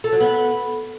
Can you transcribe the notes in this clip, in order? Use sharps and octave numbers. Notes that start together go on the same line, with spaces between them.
A4
F#3
B3